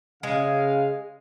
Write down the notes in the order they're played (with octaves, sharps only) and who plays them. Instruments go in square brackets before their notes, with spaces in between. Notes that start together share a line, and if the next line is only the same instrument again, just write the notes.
[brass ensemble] C#3 F5 [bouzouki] G#3